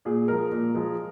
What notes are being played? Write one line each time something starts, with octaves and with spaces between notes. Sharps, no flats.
A#2 G#4
F3 G#3 A#4
A#2
F3 G#3